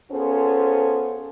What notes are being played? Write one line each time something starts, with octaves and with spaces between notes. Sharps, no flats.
B3 C#4 F4 G#4 A4 C5